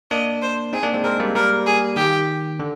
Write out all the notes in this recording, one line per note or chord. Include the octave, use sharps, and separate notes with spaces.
A#3 D4 D#5
C5
C4 D#4 G#4
A#3 D4
G#3 C4
G#3 C4 A#4
G3 A#3
G3 A#3 A#4
G#4
D#3 G4
D3